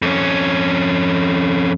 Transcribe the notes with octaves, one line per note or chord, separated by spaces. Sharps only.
F2 C#4